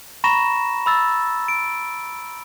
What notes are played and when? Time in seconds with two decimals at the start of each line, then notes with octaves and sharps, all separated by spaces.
0.24 A#5 B5 C#6 A#6 E7
0.86 B5 E6 A6
1.48 D7